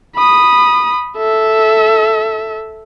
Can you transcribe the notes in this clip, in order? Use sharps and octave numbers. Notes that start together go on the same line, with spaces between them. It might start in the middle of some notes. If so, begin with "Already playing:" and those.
B5 D#6
A4 E5